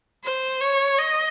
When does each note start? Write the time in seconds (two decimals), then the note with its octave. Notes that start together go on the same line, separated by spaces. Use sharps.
0.24 C5
0.61 C#5
0.98 D#5